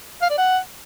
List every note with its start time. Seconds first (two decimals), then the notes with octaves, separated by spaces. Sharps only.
0.22 F5
0.30 D5
0.38 F#5